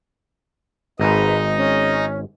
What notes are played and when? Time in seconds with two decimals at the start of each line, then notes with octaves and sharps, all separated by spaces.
1.00 G#1 G#2 D#4 B4 D#5 A#5
1.56 C#4